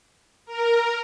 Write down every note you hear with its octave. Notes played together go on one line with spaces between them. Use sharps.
A#4